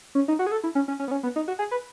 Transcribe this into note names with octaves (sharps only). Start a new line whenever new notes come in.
C#4
D#4
F#4
G#4
A4
E4
C#4
C#4
C#4
B3
C#4
B3
D#4
F#4
G#4
B4